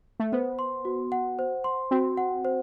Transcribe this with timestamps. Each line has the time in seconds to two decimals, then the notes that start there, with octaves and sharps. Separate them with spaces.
0.20 A3
0.32 B3 C5
0.59 C6
0.85 F#4
1.12 F#5
1.39 C5
1.64 C6
1.91 C4 F#4
2.18 F#5
2.45 C5